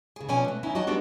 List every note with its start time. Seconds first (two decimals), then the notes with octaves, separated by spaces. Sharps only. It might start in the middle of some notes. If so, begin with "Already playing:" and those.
0.16 C#3 G#4
0.29 B2 F3 C#4 D5 G#5
0.45 A3 F#4
0.63 D#3 C#4 D#4 E4
0.75 F#3 F#4 G4 D5 D#5 A5
0.87 G3 G#3 B3 D4 D#4 F#4